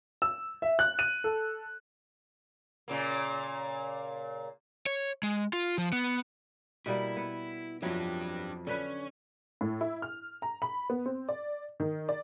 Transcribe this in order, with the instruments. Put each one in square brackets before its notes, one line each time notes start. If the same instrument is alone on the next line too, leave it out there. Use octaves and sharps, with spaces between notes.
[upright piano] E6
E5
F#6
D#7
A4
[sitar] A#2 C#3 A#3
[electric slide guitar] C#5
G#3
F4
F3
B3
[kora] B2 G3 A#3 [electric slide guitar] E4
[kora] B3
[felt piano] F2 F3 [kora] F#3 E4 [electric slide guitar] D4 G4
[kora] D3 B4 [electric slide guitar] C#4
[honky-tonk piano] A2
E4
F6
A#5
B5
B3
C4
D5
D#3
D5